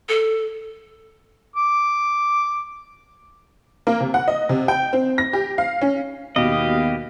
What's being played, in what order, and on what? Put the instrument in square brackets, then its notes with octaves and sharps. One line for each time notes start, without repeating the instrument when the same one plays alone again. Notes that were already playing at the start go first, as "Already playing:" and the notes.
[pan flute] A4
[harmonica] D6
[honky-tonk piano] A#3
C3
F#5
D#5
C3
G5
C4
A#6
G4
F5
C#4
[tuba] D#2 [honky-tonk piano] B2 [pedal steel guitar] G4 D#5 [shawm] F5